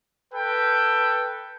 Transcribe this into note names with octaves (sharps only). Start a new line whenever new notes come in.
A4 B4 G5